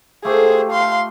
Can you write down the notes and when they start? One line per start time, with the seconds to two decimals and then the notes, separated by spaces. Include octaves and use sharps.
0.25 A3 F4 G4 G#4 C5
0.72 F5 C6